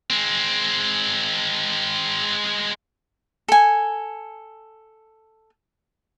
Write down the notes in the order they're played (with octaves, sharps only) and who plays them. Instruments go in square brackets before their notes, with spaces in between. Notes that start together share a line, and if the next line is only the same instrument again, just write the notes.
[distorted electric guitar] G#3 C4
[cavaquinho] A4 G#5